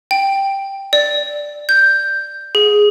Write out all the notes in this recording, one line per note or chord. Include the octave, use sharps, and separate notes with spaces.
G5
D5
G6
G#4